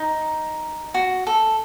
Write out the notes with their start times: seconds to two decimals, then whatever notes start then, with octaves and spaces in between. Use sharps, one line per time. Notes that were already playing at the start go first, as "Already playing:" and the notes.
Already playing: D#4
0.94 F#4
1.27 A4